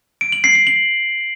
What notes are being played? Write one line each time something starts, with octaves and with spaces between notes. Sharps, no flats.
D7
F#7
C7
C7
F#7